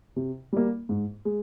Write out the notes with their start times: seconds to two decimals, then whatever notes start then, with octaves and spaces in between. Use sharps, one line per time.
0.16 C3
0.53 G3 A#3
0.89 G#2
1.25 G#3